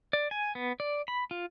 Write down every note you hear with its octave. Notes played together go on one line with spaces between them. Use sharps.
D5
G#5
B3
D5
B5
F4